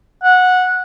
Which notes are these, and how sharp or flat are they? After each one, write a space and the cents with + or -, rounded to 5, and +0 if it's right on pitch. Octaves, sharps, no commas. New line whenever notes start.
F#5 -15